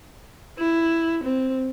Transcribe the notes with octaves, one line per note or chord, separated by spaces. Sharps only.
E4
C4